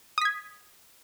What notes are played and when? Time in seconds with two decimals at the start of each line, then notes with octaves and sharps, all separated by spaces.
0.18 D#6
0.21 B6
0.25 G#6